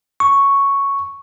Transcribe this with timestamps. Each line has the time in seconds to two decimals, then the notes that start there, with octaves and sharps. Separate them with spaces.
0.20 C#6